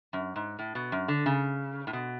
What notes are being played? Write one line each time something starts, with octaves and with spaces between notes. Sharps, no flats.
F#2
G#2
A2
B2
F#2
D3
C#3
A2
B2